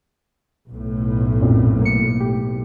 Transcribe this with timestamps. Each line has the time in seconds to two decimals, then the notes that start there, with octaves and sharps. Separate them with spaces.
0.70 B1 A2
1.41 F#2 A#2 C4
1.81 A#3 C#7
2.20 G4